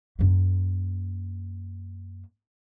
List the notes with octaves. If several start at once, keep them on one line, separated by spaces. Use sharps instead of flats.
F#2 A#3